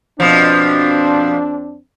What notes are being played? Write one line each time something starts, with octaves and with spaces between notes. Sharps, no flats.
F2 B2 F3 C4 D4